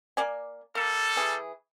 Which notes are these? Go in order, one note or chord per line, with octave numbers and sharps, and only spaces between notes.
A#3 D5 G#5
G3 A#3 A4
E3 G#4